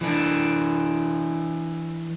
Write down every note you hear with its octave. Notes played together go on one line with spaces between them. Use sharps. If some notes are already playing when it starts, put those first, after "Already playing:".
E3 D4